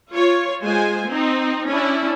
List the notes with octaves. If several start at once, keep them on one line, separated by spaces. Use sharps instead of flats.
F4 C#5
G#3 F4 C5 G#5
C4 D#4
C#4 D4 E4